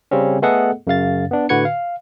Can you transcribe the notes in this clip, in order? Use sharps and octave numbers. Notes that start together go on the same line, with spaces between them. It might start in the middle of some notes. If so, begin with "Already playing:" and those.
C#3 G3 C4 C#4
A3 B3 G#4 A4 D#5 F#5
F#2 C#3 F5 A6
B3 D4
A2 D3 F#4 B4 G#6 C#7
F5